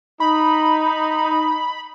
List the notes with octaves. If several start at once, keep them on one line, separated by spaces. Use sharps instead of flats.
D#4 B5